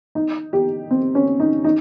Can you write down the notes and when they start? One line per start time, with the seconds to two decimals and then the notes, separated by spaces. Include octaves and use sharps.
0.15 D#4
0.53 G4
0.91 C4
1.15 C#4
1.40 D#4
1.64 D#4